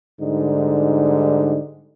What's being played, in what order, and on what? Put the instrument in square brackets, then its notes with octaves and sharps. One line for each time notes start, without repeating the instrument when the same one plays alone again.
[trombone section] G#2 D3 G3 D#4